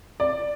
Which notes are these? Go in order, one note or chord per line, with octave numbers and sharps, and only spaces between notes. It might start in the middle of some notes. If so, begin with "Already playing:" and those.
D5